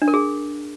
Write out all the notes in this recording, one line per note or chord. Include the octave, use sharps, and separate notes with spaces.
D4
A#4
G#4